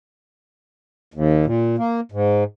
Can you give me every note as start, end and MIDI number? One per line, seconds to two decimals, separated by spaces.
1.14 1.46 39
1.46 1.76 46
1.78 2.00 58
2.12 2.44 44